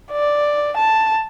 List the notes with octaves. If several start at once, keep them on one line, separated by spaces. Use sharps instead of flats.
D5
A5